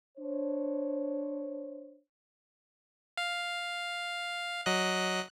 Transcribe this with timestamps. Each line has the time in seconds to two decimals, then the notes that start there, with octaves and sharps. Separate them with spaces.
0.18 D4 C5 C#5
3.17 F5
4.66 F#3 D#5 F#6